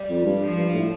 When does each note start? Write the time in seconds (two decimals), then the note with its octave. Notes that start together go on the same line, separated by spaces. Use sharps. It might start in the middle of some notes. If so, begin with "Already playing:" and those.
Already playing: G3
0.09 F2
0.26 G2
0.41 F3
0.57 G2
0.74 A2